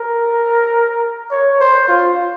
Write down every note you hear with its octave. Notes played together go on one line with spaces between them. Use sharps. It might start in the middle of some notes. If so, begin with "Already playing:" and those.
Already playing: A#4
C#5
C5
F4